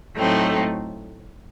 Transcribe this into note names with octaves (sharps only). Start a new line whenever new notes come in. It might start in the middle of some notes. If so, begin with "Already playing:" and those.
A2 F#3 A3 C4 D#4